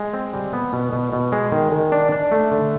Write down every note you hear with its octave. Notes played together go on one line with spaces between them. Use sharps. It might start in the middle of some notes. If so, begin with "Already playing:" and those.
Already playing: G#3
C4
G3
B3
B2
B2
B2
G#3
D#3
D#3
D4
D4
A3
D3